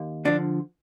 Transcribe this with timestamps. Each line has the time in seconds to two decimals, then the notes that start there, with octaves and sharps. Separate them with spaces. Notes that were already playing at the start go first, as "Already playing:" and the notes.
Already playing: D#2
0.25 D3 F3 D4